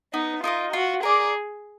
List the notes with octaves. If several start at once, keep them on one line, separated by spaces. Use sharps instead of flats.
B3 D#4
D#4 F4 A#4 D#5
F4 F#4
G#4 A#4 D5